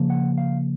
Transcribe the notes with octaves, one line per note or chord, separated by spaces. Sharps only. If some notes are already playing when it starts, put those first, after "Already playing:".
Already playing: C#3 F3 A#3
F#5
F5